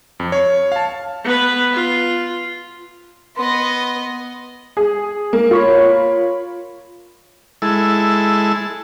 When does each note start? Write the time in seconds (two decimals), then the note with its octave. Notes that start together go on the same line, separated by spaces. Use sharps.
0.20 F2
0.32 C#5
0.72 F5 A5
1.25 B3 B4
1.73 F4
3.37 B3 D#5 C6
4.77 G#4
5.33 A#3
5.51 F4 C#5 B5
7.62 G#3 E4 A4